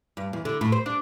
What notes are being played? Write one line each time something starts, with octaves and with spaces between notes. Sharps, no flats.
G2
E2
D3
A2
C5
D4